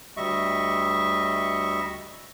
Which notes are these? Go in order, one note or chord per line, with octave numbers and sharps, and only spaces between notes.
D2 G3 D#5 E5 C#6